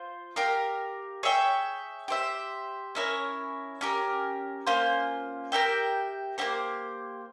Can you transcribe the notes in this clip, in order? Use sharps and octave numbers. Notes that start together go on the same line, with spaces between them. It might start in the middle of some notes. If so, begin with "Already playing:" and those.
Already playing: F4 C5
G4 A#4 F5
G#4 C#5 E5 G5
G4 C5 E5
C#4 E4 A#4 C#5
C#4 G4 A#4
A#3 C#4 F4 C5
G4 A#4 E5 G5
A#3 E4 G4 C5